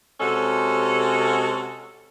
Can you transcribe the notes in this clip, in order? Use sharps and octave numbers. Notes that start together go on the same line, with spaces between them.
C3 G#3 C#4 F#4 A4